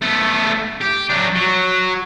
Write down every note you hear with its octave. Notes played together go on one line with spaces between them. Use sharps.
A3 B3
G4
F#3 D4
F#3